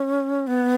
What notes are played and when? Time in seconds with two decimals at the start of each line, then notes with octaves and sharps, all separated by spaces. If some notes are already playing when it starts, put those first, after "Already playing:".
Already playing: C#4
0.47 B3